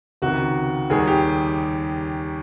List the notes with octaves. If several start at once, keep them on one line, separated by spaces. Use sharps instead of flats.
C#2 C3 D#3 F#4
D#2 D#3 G3 G#4
G4